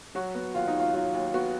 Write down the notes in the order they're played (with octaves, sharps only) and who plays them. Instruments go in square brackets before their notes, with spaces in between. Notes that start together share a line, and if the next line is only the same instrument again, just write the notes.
[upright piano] F#3 F#4
B3
D#2 F4
D#4
D#2
F4
F#3 F4
D#2
B3 F#4